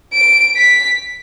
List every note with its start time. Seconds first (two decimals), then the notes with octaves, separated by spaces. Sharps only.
0.14 D7
0.57 B6